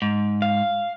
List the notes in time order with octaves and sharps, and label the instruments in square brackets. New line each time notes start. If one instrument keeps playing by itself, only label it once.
[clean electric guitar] G#2
[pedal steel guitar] F5